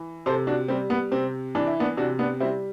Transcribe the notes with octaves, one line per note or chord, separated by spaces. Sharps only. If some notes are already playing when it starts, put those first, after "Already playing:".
Already playing: E3
C3 A4 C5
D4 F#4
G3 C4
B3
C3 C4
E3 D4
E4
B3 D4
C3 D4 F#4
B3 D4
G3 C4 E4